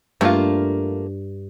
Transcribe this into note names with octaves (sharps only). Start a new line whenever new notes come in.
G2 A3 A#3 F4